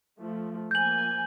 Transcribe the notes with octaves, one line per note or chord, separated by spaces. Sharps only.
F3 A3
F3 A#3 G#5 G6 F#7